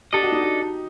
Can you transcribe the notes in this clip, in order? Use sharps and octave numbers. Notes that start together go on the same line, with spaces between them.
D4 G4 A4 D#5
F#4
D#4
F#4